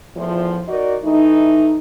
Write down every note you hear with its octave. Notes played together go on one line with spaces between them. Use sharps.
E2 A2 F3
D#4 F#4 A#4 D5
E3 A3 D#4